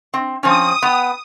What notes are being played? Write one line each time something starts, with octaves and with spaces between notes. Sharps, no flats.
C4
F3 C4 C#4 D#6
B3 G5